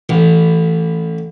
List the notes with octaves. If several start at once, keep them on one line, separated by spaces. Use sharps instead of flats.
A1